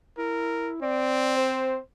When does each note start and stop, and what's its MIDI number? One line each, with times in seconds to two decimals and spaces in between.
0.18 0.77 64
0.18 0.72 70
0.82 1.78 60
0.82 1.32 74
1.37 1.78 72